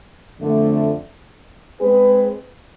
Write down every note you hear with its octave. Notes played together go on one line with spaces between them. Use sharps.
F2 D3 A3
G#3 C4 G#4 B4